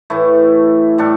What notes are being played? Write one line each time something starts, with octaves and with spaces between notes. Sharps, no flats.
A2 E3 A3 E4
A2 G3 D4 A4